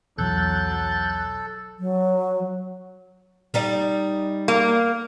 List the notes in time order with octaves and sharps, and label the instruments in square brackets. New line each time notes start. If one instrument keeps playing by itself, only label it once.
[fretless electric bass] B1 E2 [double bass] F#3 [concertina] A4 [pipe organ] F#6 G6 A6
[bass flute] F#3
[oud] G3 D#4 D5
[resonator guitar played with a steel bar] A#3